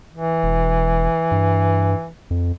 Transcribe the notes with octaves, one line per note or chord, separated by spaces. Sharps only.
E3
E1
G2
F2